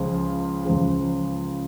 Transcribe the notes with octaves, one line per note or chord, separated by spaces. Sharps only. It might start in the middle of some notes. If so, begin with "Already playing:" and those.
Already playing: C#2 C#3 F3 G#3
C#2 C#3 F3 G#3